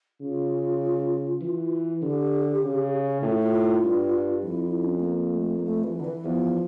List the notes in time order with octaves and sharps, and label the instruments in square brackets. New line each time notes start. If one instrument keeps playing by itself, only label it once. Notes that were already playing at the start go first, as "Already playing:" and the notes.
[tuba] C#3 [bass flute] F4
[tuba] E3
[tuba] D3 [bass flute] G4
[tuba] C#3
[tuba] A2 [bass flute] F4
[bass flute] E4
F4
[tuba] G2
[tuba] F2 [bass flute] E4
[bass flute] E4
C#4
A3
A#3
A3
A#3
A3
E3
D3
E3
[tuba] E2 [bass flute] F3